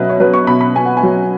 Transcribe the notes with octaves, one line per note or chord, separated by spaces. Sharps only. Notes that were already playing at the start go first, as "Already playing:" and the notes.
Already playing: B2 F#3 B4 E5
C#5
F#3 B4
C#6
B2 B5
B5
B2 G#5
F#5
G#5
F#3